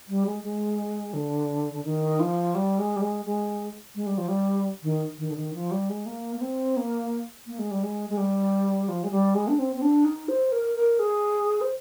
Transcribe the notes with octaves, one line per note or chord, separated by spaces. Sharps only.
G3
G#3
G#3
D3
D3
D#3
F3
G3
G#3
G3
G#3
G#3
G#3
G3
F3
G3
D#3
D#3
D3
D#3
F3
G3
G#3
A#3
A#3
C4
A#3
A#3
G#3
G3
G#3
G#3
G3
F3
G#3
G3
G#3
D4
C4
C4
D4
D#4
C5
A#4
A#4
G#4
C5